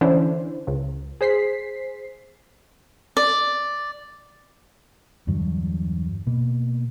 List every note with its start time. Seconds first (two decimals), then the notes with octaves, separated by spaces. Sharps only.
0.01 D3 E3 C#4 D4 E4 C5
0.67 C#2
1.21 G#4 C5 B6 C7
3.17 D5
5.27 E2 G2 D3 F#3
6.27 B2 A#3